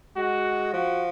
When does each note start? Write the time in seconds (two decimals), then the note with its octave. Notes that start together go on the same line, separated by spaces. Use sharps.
0.16 G#3 F#4
0.73 F3 F#4